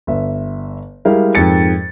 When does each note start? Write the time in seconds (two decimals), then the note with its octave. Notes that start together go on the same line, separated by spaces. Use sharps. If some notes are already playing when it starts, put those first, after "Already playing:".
0.07 G1 E5
1.05 G3 G#3 E4 A#4 F5
1.35 F2 G#2 A#4 A6 C#7